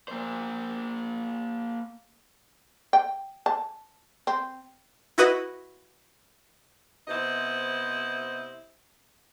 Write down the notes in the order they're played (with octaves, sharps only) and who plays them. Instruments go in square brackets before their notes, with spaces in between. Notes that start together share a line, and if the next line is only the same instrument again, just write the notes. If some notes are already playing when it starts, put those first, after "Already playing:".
[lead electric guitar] A#3 C5
[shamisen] G5
A5
C4
[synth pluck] E4 F#4 B4 D#5
[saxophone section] C3 B3 E4 C5 D#5